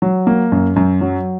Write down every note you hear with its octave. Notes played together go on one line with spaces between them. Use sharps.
F#3
A#3
F#2
F#2
F#3